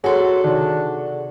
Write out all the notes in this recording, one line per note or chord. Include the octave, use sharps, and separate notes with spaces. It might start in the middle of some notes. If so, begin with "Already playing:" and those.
F#3 F#4 G#4 A4 C6 B6
C3 D#3 D4